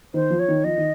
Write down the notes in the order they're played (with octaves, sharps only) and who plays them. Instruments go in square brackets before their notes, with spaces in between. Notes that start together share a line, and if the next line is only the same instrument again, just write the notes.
[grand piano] D#3 [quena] C5
[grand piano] F3
[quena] C#5
[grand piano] D#3
[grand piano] F3 [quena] D#5
[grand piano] D#3